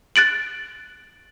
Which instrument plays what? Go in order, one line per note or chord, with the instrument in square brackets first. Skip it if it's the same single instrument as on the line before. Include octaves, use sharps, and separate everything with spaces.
[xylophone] F#6 A6 D7 F#7